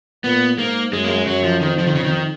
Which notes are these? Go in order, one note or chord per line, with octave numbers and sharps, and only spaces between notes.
A#2 B3
G#2 A#3
F#2 G#3
A#3
G#3
F#2 F#3
F3
F2 D#3
F3
D#3
C#3
D#3